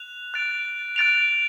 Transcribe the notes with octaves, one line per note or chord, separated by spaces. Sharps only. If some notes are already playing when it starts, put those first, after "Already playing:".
Already playing: F#6 F7
F#6 A6 D7 F7
F#6 A6 D7 F7